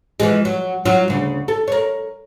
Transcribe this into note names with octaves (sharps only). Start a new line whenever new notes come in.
E3 F3 G#3
F#3
F#3 F4
D2 C#3
A4
A#4 C#5